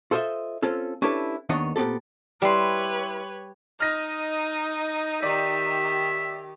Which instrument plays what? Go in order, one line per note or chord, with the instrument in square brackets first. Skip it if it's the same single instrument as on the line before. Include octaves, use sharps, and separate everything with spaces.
[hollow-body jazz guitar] F4 A4 C5 C#5 D#5 E5
C4 C#4 F4 A4
C#4 D4 E4 G4 A4 B4
D#2 D#3 B3 D4 C#5 D#5
A#2 B3 C4 G4 A4
[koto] G3 [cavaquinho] E4 C6 [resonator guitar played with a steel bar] G4 [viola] B4 C#5
[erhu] D#4 [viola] D#5 [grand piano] F6 A#6
[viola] D#3 G4 [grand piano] D5 [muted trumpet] E5